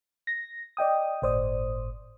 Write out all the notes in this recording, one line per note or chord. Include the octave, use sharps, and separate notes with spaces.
A#6
D5 D#5 G5 D#6
G1 A2 C5 D5 D#6